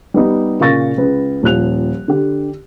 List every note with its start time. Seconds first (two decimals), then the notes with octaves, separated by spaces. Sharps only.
0.14 G3 B3 D#4
0.60 A#2 C#3 F5 C#6 A6 A#6
0.98 C#2 B4
1.43 D#1 F3 F#6 F7
2.08 D3 G4